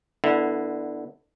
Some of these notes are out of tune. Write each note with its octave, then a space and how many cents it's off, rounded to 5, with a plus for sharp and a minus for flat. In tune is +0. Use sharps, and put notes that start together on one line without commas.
D3 +15 B3 -20 E4 +0